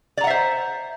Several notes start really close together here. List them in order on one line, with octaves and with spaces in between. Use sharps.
D5 A#5 F#5 E5 C5